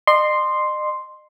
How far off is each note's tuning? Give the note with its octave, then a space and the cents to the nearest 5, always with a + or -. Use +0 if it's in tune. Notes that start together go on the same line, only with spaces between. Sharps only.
D#5 -40 C6 +0